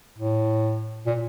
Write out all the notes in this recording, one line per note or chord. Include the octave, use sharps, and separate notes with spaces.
A2
A#2